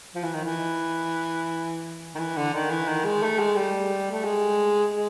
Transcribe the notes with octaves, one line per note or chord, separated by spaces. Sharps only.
F3
E3
D#3
E3
D#3
E3
D3
D#3
E3
D#3
G#3
A3
G#3
G3
A3
G#3
G#3